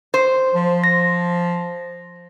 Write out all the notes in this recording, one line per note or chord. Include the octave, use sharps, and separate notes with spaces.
C5
F3
A#6